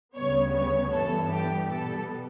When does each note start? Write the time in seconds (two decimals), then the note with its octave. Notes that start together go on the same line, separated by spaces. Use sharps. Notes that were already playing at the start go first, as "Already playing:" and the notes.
0.15 D2 C#3 G3 B3 C#5
0.53 C#5
0.92 G2 E3 G3 B3 A4
1.31 G4
1.69 B2 G3 B3 A4